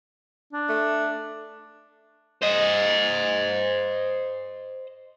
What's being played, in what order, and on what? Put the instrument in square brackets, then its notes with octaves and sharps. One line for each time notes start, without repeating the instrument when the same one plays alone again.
[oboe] D4
[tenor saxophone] A3
[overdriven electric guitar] C5 D#5